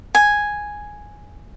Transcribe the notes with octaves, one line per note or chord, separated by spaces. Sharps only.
G#5